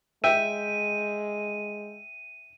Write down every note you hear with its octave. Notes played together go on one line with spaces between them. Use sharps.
G#3 E5 G5 D#7